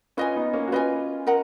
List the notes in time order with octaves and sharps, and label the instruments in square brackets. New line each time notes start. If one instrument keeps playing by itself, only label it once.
[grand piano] C#4 F4 [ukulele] B4 D#5 G#5
[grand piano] B3 D#4
A#3 C#4
F#4
[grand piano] C#4 F4 [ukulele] B4 D#5 G#5
[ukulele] A#4 D#5 F#5 A#5